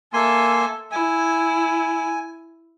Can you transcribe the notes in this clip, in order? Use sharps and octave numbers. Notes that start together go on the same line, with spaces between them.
A#3 A4 E5 G#5 C6
E4 G#5